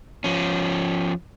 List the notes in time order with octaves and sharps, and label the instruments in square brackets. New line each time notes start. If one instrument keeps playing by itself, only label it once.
[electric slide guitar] F3 C#4